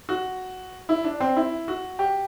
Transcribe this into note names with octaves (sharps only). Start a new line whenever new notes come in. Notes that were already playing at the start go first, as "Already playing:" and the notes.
F#4
E4
D4
C4
E4
F#4
G4